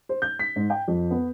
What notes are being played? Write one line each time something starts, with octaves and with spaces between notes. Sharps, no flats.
C5
G6
B6
G#2
G5
F2
B3